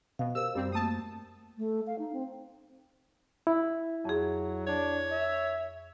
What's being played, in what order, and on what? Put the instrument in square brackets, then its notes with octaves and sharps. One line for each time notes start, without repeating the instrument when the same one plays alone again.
[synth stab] B2 [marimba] F5
[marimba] G4 A#4 C5 [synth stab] E6
[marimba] F#2 [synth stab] G3 C4
[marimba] A3 A#3 [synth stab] A5 D#6
[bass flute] A3
F5
D#4
C4
[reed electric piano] E4
[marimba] F2 G#4 [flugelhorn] F#3
[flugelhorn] D4 [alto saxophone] C#5
[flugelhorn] E5